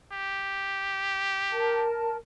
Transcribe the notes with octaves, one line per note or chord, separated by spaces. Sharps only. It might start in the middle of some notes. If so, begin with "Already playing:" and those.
G4
A#4 A5